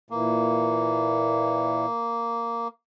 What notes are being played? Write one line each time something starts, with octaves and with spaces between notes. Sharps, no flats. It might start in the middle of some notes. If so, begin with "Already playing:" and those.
A#2 E3 A#3